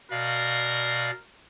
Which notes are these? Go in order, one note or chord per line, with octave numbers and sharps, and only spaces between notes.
B2 A#4 D5 F5